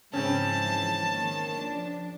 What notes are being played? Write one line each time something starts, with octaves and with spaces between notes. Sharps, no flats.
G#2 C#3 E3 F3 C4 C#4 A5
D#3 A#3
F3 D4